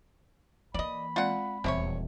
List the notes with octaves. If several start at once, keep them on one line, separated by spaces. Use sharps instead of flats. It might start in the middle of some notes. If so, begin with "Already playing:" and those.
E3 A#3 D5 D#5 B5
G#3 C4 F4 D5 F#5
D#1 E2 C3 C4 E4 C#5 E5